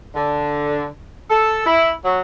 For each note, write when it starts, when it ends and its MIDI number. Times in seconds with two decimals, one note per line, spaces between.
0.15 0.87 50
1.29 1.64 69
1.66 1.92 64
2.04 2.21 54